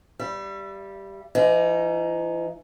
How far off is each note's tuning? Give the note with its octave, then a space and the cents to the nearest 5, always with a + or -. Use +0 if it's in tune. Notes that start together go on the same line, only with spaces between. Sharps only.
G3 +0 E5 +40
E3 +45 D#4 +0